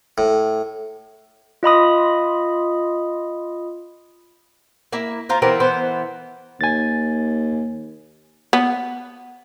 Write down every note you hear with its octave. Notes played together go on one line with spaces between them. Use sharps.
A2
F4 D#5 B5 D#6
A#3 E4
F4 A#4 C5
E3 B3 C4 A#4
E3 B3 C5
D#2 G#5 A6
B3